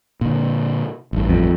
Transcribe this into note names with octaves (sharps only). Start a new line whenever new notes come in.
A#2 D3
A1 G2
F2